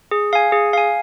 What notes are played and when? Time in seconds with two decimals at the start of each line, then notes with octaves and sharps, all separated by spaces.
0.11 G#4
0.33 F5 G#5
0.52 G#4
0.73 F5 G#5